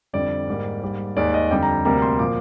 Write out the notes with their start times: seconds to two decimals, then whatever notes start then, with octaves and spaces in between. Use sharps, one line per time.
0.13 F2 D3 G3 D5
0.48 G#2 G3 A#3
0.82 G#2 G3 A#3
1.16 D#2 D#3 G#3 D5
1.34 D#5
1.51 F2 D3 G3 G5
1.63 A#5
1.85 D2 C3 G3 A#3 A#5
2.02 C6
2.19 A#2 F3 A#3 D6